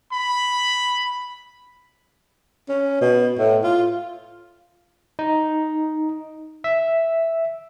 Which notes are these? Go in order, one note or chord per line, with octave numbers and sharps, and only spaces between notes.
B5
C#4
B2
A2
F4
D#4
E5